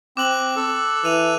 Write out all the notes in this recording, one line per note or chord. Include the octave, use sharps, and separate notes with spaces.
C4 D6 F#6 F#7
A4
E3 F#6 D#7 F7